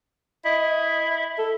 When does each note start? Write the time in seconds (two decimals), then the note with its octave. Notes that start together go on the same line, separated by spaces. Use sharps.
0.45 E4 D#5
1.38 A4